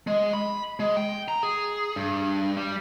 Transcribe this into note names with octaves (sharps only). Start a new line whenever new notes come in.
G#3
B5
G#3
G5
A#5
G#4
G2
G3